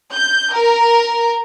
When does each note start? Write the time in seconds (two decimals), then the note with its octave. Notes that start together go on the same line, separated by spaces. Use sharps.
0.13 G6
0.53 A#4